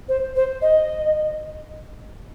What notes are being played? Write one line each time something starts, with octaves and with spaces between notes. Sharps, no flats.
C5
C5
D#5